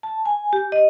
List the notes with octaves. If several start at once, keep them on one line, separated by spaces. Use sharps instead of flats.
A5
G#5
G4
D#5